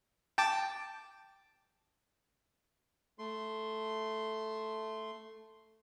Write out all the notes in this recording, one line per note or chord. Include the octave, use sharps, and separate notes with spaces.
G5 A5 D6
A3 C6